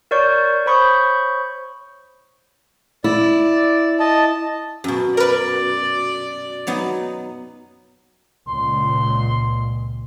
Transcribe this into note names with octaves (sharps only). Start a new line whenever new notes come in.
A#4 C#5 D5 C#6 G6
C5 C#5 B5 C#6 D#6 G6
E4 D5
D#5 A5
F#2 B2
A#4 B4 D5
F#3 B3 D#4
C#2 A#2 C6